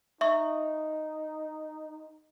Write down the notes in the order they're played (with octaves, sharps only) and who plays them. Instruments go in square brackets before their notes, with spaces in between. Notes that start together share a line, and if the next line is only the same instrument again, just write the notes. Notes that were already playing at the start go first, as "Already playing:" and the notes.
[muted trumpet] D#4 [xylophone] E5 C#6